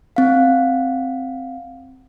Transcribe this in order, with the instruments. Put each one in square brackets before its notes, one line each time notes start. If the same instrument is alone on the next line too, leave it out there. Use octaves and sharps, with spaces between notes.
[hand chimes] C4 F5